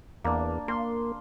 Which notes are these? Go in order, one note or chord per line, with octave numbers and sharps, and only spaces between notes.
E2 A#3 D4
A#3 C6